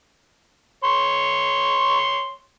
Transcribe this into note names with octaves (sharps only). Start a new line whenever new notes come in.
C#5 C6